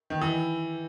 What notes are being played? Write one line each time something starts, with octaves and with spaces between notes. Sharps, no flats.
D#3
E3